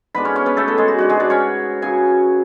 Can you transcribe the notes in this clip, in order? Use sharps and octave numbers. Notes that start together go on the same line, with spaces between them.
G#2 G#3 B3 D4 B4 B5
C#4 C#5
C#4 C#5
B3 B4
A3 A4
A3 A4
G#3 G#4
F#4
G#2 G#3 D4 F#4
G#3 G#4
D4 D5
C#4 C#5
F#2 C#3 F#3 G#4 G#5